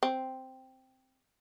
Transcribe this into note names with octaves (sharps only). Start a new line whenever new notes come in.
C4